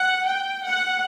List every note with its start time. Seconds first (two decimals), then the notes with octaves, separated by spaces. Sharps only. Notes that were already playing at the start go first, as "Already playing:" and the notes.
Already playing: F#5
0.25 G5
0.63 F#5